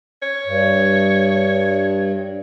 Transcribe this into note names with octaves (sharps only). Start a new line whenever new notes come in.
C#5
G2